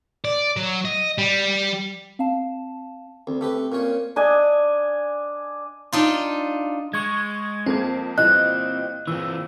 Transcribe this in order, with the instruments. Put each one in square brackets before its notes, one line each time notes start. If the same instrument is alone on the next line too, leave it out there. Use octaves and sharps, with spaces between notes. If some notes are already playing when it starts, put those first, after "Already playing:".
[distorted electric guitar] D5
F#3
D#5
G3
[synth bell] C4 F5 A5
[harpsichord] D2 [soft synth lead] C4
[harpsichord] A3 G4 B4
[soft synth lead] C4
[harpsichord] A#2 C#4 C#5
[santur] D4 D#5 G#5
[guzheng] D4 D#4 F4
[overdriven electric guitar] G#3 [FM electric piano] C#6 G#6
[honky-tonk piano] F2 A#3 G#6 [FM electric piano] C4
[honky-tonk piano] A#2 E3 G3 [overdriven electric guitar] C4 [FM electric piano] D#5 [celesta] F#6
[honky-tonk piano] A#2 [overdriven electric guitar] E3 C4 [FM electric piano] E6